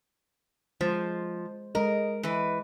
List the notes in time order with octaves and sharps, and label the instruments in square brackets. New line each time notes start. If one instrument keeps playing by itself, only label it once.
[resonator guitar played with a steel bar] F3 [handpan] G#3 C5
[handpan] G#3 D#5 [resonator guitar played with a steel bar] A#4
[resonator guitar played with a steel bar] E3 B4